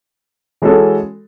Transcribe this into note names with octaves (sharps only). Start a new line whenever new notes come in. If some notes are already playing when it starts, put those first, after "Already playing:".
E3 G#3 C#4 F#4 A4